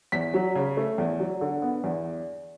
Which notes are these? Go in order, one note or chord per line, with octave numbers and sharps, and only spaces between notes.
E2 B6
F#3
C#3
A3
E2
F#3
D3
B3
E2